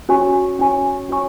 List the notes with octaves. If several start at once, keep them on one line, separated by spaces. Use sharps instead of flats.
C#4 F#4 C#5 G#5 C#6
C#4 F#4 C#5 G#5 C#6
C#4 F#4 C#5 G#5 C#6